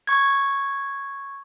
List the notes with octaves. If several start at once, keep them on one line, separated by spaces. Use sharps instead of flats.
C#6 G#6